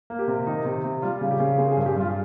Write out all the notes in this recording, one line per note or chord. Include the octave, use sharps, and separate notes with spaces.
A#3
G4
C3
D#3 D#4
C3
C3
G3 F4
C#3
G4
C#3
C4 G#4
G#4
G2
G4
G2 F4